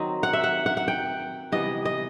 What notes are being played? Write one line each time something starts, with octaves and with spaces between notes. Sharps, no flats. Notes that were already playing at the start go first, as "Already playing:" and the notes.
Already playing: D#3 F#3 C4 D#5
F#5
E5
F#5
F#5
F#5
G5
C3 E3 G3 B3 D#5
D#5